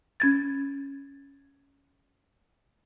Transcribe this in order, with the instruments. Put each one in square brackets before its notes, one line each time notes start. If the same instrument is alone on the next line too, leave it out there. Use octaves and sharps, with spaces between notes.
[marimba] C#4 G#6 A6